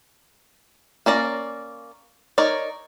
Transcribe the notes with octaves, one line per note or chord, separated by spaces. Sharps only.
A#3 C#4 D5 A#5
D#4 A#4 C#5 D5